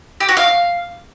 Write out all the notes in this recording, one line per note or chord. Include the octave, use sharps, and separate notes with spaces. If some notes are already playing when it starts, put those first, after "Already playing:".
G4
F#4
F5